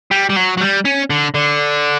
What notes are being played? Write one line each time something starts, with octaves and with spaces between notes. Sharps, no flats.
G3
G3
F#3
F#3
G3
C#4
D3
D3